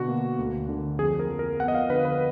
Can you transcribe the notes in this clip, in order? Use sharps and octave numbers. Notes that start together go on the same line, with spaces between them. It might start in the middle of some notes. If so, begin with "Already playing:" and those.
Already playing: B2 D3 F#4
A#3
D2
D3
F2 G#4
A#4
F3
A#4
B3 F#5
D#5
F5
D3 B4
B4